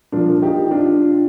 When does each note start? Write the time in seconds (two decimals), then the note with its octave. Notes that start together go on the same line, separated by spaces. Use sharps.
0.12 A#2 F3 D4 F4
0.42 D#4 G4
0.71 D4 F4